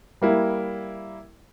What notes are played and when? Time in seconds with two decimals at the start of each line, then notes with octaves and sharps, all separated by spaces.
0.22 G3 A#3 E4